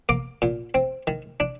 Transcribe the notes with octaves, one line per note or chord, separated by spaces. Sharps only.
A#3 D6
A#2
C4
D#3
D4